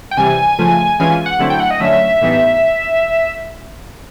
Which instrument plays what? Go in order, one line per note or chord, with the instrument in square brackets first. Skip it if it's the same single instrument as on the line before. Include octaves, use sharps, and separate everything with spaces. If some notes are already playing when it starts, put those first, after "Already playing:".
[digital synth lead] G5
[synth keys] C3 E3 G3 [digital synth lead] G#5
[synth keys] C#3 F3 A3
[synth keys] E3 G#3 C#4 F4 [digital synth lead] G#5
[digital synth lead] F#5
[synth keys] D3 F#3 A3 C4 E4
[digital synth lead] G5
F#5
D#5
[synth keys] D3 F#3 A3 C#4 [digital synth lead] E5
[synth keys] A2 E3 G3 B3 D#4